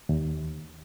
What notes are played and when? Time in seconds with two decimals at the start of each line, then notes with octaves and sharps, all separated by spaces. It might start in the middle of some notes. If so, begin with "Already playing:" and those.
0.09 D#2